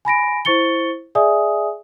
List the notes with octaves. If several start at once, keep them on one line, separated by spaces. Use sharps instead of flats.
G#5 B5 A#6 D7
E4 C5 C#6 A6 C#7 G7
G#4 D5 E5 G#5 D#6